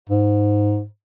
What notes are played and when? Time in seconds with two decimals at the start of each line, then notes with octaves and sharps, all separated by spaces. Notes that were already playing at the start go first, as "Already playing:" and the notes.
0.09 G#2